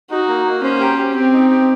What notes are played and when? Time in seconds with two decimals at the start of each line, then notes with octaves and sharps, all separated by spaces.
0.11 D#4 F#4
0.28 A#3
0.45 A#3
0.63 C#4 C5
0.80 G4
0.98 G4
1.16 C4 G4
1.33 D#4
1.50 G4